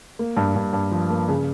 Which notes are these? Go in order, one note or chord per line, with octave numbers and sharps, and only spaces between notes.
A#3
G2
G2
G2
F3
A#3
C#3